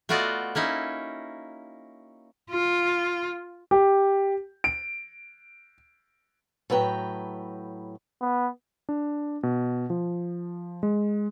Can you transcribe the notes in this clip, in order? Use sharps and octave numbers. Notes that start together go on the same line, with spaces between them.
A3 B3 F4 F#4 D5 D#5
A#3 C#4 D#4 E4
F4
G4
D7
A2 F#3 B4 G5 A#5
B3
D4
B2
F3
G#3